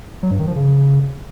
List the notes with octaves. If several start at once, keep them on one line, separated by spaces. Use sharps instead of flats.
F#3
G2
D#3
F3
C#3